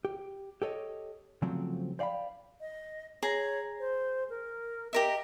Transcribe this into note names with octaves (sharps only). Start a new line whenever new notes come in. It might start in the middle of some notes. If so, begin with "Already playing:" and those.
G4
G4 A4 C#5 D#5
C#3 F3 F#3 A3 C4
C5 D5 F5 G5 B5
D#5
G#4 C#5 A#5
C5
A#4
G4 A#4 D#5 E5